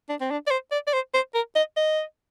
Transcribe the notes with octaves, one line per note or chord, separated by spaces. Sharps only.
D4
C4
D4
D5
C5
D5
D5
C5
C5
A#4
D#5
D#5